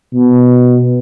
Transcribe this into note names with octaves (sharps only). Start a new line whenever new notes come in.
B2